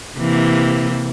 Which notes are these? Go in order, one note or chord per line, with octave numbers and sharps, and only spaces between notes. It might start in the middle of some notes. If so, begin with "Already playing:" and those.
C3 E3 A#3